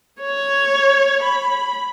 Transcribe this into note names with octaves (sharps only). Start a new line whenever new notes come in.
C#5
B5